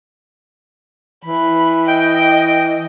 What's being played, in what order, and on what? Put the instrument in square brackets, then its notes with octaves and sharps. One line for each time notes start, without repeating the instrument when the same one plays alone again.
[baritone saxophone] E3 [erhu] B5
[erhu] D#5 [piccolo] G5